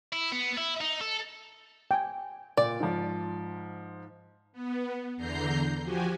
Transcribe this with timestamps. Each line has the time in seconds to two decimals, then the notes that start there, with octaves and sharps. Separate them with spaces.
0.13 E4
0.32 B3
0.57 E4
0.81 D#4
1.01 A4
1.91 G5 G#5
2.57 A#2 D5
2.80 G#2 F3
4.53 B3
5.17 E2 D3 A#5 G6 C7
5.82 F3 F#4 G4 G#5